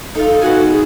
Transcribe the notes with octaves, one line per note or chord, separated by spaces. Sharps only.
D#4 F4 A4
A4
B2 F#4 F#5 G#5
G#4